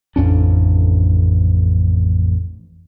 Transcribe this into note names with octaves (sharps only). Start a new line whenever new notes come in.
A1 F2 C#4 D4